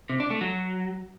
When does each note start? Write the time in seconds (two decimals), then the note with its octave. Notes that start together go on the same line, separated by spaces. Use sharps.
0.09 C3
0.20 D4
0.30 A3
0.41 F#3